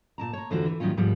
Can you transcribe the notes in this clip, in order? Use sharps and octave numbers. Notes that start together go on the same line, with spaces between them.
A#2 A5 A#5
C#5 A#5
F2 D3 E3 F4 F#4 C5
E3
A2 D#3 F#3 G3 C#4 F4
D#2 G#2 F3 G3 B3